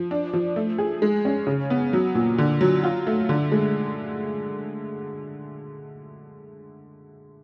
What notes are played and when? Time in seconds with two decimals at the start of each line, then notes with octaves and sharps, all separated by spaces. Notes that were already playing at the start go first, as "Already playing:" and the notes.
Already playing: F3
0.11 D4
0.33 F3
0.56 A3
0.78 G#4
1.02 G#3
1.25 C#4
1.47 C#3
1.70 B3
1.93 F#3
2.15 A#2
2.38 D3
2.61 F#3
2.83 F4
3.07 A3
3.29 D3
3.52 G#3